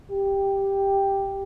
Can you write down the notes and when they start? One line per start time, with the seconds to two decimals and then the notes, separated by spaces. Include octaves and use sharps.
0.12 G4